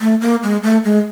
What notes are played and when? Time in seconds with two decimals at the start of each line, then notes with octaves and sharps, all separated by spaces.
0.01 A3
0.21 A#3
0.43 G#3
0.63 A3
0.84 G#3